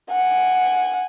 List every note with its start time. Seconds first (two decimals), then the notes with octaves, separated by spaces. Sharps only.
0.12 F#5 G#5